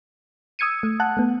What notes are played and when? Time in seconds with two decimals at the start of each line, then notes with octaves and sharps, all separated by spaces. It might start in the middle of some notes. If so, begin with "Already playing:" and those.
0.59 D#6 E6 G#6 C#7 D#7
0.83 A3
1.00 F#5 A5 F#6
1.17 A3 B3